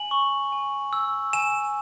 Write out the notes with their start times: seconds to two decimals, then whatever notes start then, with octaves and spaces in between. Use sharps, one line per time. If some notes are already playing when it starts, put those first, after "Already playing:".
Already playing: G#5 F#7
0.11 C#6
0.52 G#5
0.93 E6
1.33 G#5 E7